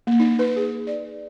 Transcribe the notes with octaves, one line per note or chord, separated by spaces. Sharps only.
A#3
D#4
B4
G#4
D5